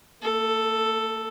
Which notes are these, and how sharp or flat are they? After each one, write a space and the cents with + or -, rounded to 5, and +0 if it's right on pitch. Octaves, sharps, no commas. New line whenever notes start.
A#3 -45 A4 +5